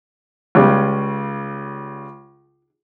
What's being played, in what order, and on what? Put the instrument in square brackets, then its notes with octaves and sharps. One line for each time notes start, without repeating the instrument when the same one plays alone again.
[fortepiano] C#2 C#3 G3